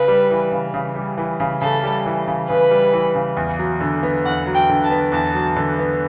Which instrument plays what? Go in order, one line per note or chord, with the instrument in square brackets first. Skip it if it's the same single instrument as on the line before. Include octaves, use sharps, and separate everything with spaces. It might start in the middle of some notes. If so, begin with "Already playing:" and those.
Already playing: [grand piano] C#3 [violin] B4
[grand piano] G3
E3
C#3
C#3
G3
E3
C#3
[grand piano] C#3 [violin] A4
[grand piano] G3
E3
C#3
[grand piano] C#3 [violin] B4
[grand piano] G3
E3
C#3
E2
F#3
D3
B3
[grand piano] E2 [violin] F#5
[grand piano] F#3
[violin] G5
[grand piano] D3
[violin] A5
[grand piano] B3
[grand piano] E2 [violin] A5
[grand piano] F#3
D3
B3